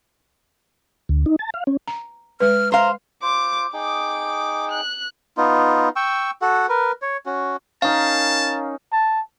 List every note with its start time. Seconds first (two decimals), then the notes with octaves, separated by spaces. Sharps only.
1.09 D2
1.26 D#4
1.39 A5
1.54 F5
1.67 C#4
1.88 A#5
2.40 G#3 B4 F6
2.72 C5 F5 A#5
3.22 F4 C5 D6
3.74 D#4 G#4 G5 D6
4.71 F#6
5.37 B3 D#4 F4
5.96 G5 C#6 E6
6.42 F#4 A4 F#5
6.69 A#4 B4
7.02 C#5
7.26 C#4 F#4
7.82 C#4 D#4 A#4 F5 A5
8.92 A5